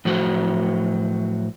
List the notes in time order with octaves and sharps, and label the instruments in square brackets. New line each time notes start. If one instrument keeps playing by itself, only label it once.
[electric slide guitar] A2 F3 F#3 F#4 C5